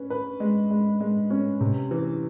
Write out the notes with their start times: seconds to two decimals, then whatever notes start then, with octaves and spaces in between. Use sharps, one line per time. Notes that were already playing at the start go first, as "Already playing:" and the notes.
Already playing: C#4 B4
0.10 B4
0.40 G#3
0.70 G#3
1.00 G#3
1.30 C#4
1.61 C3
1.91 E3